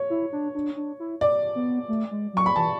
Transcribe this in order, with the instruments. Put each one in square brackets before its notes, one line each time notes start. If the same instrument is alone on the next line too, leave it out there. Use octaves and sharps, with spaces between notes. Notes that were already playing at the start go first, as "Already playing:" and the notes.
Already playing: [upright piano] C#5
[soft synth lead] E4
D4
D4
D4
E4
[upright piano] D5
[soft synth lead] B3
A3
G#3
[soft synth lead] F#3 [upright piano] C#6
[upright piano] B5
[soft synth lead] E3 [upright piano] A5